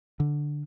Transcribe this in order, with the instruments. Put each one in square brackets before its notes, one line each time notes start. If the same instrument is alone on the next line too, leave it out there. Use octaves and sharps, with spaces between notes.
[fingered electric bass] D3